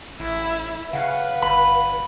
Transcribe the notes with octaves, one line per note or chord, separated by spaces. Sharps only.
A1 E4
C#3 B4 F5 F#5
G1 B5